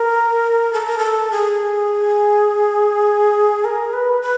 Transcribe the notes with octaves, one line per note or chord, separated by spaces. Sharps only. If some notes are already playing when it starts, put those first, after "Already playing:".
Already playing: A#4
A4
A#4
A4
G#4
A#4
B4
B4